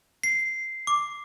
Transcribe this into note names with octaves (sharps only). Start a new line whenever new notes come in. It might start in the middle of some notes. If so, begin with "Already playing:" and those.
C7
D6